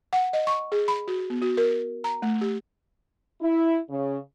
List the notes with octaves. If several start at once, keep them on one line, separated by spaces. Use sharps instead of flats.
F#5
D#5
C#6
G#4
B5
F#4
B3
F#4
A#4
A#5
A3
G4
E4
C#3